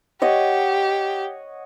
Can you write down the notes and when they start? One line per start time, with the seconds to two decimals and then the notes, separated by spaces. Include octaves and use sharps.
0.22 G4 C#5 D#5 F#5